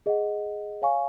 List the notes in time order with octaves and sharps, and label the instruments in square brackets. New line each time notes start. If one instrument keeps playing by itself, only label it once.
[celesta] G#4 D#5 F#5
C#5 F5 G#5 C#6